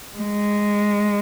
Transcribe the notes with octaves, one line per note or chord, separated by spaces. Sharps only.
G#3